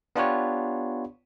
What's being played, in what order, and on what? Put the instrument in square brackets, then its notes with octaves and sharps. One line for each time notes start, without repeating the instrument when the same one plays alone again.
[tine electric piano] B3 D4 F4 G4 B4 C#5